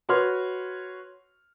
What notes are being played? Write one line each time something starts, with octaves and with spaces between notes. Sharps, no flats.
F#4 B4 C#5 C6 F6